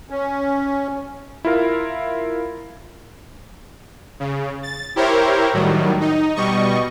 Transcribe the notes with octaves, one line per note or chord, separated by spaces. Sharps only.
C#4
E4 F4 A#4 F5
C#3
A6
E4 G4 A#4 C5 C#5
A2 D#3 F#3 G3
D#4
B2 G3 D#5 C#6